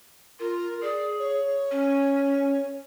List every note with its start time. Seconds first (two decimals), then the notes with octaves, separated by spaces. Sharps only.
0.40 F4 A#4
0.82 G#4 D5
1.19 C#5
1.71 C#4